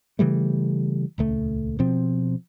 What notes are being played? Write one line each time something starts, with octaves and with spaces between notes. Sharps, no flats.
C#3 E3 G3 A3
D#1 C#2 A3
B2 F3 C4